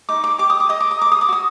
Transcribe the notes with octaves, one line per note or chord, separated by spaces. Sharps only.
D#4 D6
D6
G4 D6
D#6
D6
D#5 D#6
D6
D#6
A#4 D6
D#6
D6
F#4 D#6